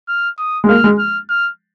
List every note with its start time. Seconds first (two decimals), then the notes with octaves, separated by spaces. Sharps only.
0.08 F6
0.38 D#6
0.64 G#3
0.68 A#3 F6
0.84 G#3
0.98 F6
1.29 F6